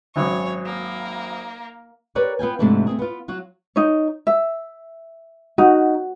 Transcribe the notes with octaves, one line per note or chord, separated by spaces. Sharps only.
G#1 F#2 C#5 G#5
A#3
G4 A#4 B4 C#5 D5
B3 F4 G5 G#5
G#2 C3 F3 A3 D4 E4
A3 C4 G#4
B3 F4
F#3 F4 F#4
D#4 C#5
E5
D#4 F#4